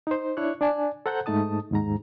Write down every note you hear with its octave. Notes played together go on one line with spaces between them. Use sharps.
D#4 C5
D4 E4 C#5 C#6 F#6
D4 D5 G#5 A5
A4 C5 F#5 A#5 F#6 G6
G#2 A3 D#4 A5 D#6
D#2 G#2 A#5